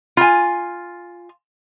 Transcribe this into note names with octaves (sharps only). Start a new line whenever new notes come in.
F4 G#5